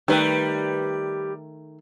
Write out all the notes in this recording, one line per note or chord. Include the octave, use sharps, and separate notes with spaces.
D#3 G3 A3 B4 G5